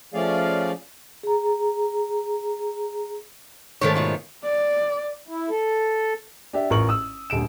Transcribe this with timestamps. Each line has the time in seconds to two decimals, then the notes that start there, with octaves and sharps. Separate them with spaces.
0.14 F3 A3 C#4 G#4 D5 F5
1.23 G#4 A#5
3.81 G#2 D#3 A3 A4 C#5
3.95 B2 F4 C#5
4.44 D5
5.28 E4
5.50 A4
6.53 D4 G4 E5
6.70 A1 F4 A#4 C#6 F#7
6.89 D#6 E6
7.30 D#1 D2 D7 E7